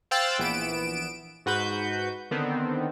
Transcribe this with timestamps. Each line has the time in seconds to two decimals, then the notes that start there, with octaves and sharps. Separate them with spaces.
0.11 C5 F5 G5 E6 F#6 A6
0.38 A#1 E3 B3 D7 E7
1.46 G#2 F#4 B4 G6
2.31 D3 D#3 B3 C4